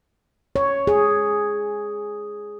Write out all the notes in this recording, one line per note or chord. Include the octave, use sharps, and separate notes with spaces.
C#5
G#4